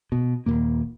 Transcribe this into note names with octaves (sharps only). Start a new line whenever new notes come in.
B2
D#1 G#1 A#2 A#3